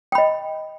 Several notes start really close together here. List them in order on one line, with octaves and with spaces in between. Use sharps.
G5 B5 D#5